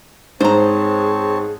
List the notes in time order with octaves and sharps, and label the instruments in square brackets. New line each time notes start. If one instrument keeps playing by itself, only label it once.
[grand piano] G#2 [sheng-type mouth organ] C4 C#5 A5 [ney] G#4 [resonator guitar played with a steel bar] C5 A#5